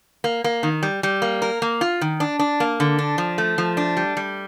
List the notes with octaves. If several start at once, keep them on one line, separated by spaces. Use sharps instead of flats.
A#3
A#3
D#3
G3
G3
A#3
A#4
A#3
F4
D#3
D4
D4
A#3
D3
D4
F3
A3
F3
D4
G3
G3